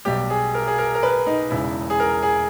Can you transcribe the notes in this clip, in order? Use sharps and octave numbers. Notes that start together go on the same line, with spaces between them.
B1 B2 G3 G4
G#4
A#4
G#4
A#4
A#4
B4
D#4
E1 E2 C#3 E4
G#4
A#4
G#4